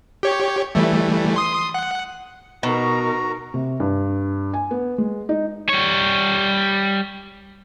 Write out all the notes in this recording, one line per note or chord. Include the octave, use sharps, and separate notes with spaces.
G4 C#5
E3 G3 A3
C6 D#6
F#5
B2 D#4 F#4 A#4 A#5
C3
G2
G#5
B3
G#3
D#4
G3 C#5